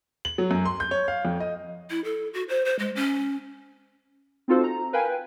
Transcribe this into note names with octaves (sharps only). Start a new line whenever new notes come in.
F#7
F#3
F#2
C6
G6
C#5
F5
F2
D#5
E4
A4
F#4
C5
C5
G#3
C#4
C4 D#4 F4 F#4 A4 C5
A#5
A#4 B4 F5 G5 G#5